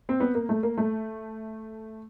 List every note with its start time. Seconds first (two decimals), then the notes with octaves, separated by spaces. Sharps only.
0.09 C4
0.20 B3
0.35 A#3
0.49 A3
0.63 A#3
0.77 A3